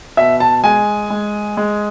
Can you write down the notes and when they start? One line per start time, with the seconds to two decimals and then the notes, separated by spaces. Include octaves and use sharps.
0.17 B2 E5
0.40 A5
0.64 G#3 G#5
1.10 G#3
1.57 G#3